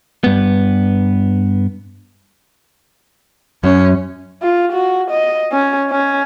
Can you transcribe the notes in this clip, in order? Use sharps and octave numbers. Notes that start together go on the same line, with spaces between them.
G2 B3
F#2 C#4
F4
F#4
D#5
C#4
C#4